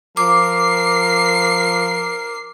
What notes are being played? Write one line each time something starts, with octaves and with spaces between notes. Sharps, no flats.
F3 A#4 D6 C7